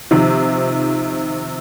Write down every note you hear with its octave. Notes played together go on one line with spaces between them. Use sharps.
C3 D#3 F3